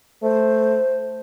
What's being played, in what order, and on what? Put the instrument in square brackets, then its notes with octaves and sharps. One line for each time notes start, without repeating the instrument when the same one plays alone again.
[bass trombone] A3 [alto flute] C5